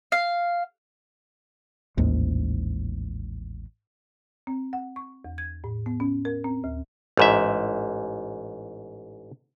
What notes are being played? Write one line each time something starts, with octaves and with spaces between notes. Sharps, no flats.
F5
A1 D#2 G#2 G#3
C4
F#5
C#6
E2
G#6
A2
B3
C#4
A#4
C4
D2
A1 G#2 E5